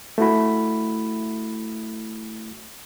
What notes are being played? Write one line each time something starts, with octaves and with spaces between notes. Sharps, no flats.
A3 E4 F#4 B5